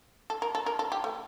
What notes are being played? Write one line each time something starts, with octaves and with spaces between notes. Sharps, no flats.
A4
A#4
A4
A#4
A4
G4
A3